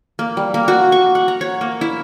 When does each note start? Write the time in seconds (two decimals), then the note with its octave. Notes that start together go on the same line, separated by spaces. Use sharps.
0.19 A#3
0.37 G3
0.54 A#3
0.68 F#4
0.92 C#6
1.15 F#5
1.28 A#5
1.41 C#5
1.61 A#3
1.81 E4